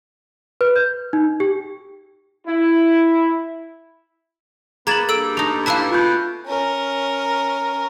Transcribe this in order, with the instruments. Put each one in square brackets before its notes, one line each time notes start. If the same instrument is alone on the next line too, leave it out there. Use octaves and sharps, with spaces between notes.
[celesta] B4
G6
D#4
G4
[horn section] E4
[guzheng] A#3 [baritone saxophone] B3 [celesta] G#4 A6 F#7 [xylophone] A#5 G#6 E7
[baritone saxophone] G2 [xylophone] A4 E6 D7
[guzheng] A3 D#4 [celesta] F7
[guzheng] E4 B4 E5 [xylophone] F5 A5
[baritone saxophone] B2 [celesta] F4 G6
[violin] C#4 A#4